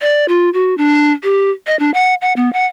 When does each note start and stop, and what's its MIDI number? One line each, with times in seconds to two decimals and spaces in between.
0.01 0.26 74
0.28 0.49 65
0.54 0.76 66
0.78 1.12 62
1.23 1.50 67
1.67 1.78 75
1.79 1.91 62
1.94 2.14 78
2.21 2.33 78
2.36 2.52 59
2.53 2.65 78